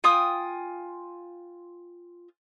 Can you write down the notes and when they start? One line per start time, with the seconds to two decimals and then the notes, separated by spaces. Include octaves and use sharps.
0.04 F4 G5 G#5 D#6